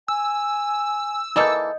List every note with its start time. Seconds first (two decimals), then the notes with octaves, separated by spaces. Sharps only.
0.08 G#5 E6
1.36 E3 A#3 A4 D#5 G6